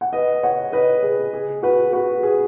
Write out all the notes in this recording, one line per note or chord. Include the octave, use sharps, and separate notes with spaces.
F#5
B4 D#5
C#5 F#5
B4 D#5
G#4
G#4
F#4 B4
F#4 B4
G#4